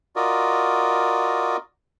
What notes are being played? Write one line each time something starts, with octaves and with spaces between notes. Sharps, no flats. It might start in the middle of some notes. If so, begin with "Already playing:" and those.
F4 F#4 A#4 D5 D#5